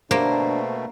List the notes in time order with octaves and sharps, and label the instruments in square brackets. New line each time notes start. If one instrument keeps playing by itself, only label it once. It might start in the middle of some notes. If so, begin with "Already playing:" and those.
[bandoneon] B2 A3 [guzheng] A#3 [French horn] D4 [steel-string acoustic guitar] C5